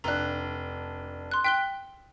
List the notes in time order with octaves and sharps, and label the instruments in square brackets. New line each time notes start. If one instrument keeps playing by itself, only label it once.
[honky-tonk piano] F1 D4 [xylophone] A#5 F#6
[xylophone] C6 F#6
[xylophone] G5 F#6 G7 [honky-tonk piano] B6